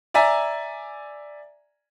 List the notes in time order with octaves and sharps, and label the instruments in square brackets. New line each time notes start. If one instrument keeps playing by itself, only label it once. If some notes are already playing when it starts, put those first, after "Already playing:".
[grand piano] D5 E5 G#5 A#5